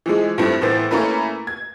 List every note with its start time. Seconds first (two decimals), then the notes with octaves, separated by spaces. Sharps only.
0.06 E3 F3 G#3
0.38 G2 F3 A3 C4 E4
0.61 A2 E3 B3 C5 A6
0.91 A3 A#3 C#4 E4 A#4 B4
1.47 G#6